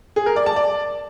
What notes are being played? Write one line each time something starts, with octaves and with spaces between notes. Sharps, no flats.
G#4
A#4
D5
A5
D5